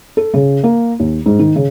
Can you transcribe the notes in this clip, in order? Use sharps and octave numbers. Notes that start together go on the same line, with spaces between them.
A4
C#3
A#3
D#2
G#2
D#3
C#3